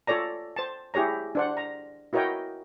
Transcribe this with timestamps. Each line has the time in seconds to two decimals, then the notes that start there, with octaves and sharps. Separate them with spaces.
0.07 F4 A4 C#5 D5 A#5
0.56 C5 A5
0.94 E4 G4 G#4 C#5 A#5
1.35 D4 C5 F#5
1.57 A#5
2.13 E4 F#4 A#4 C#5 D#5 G5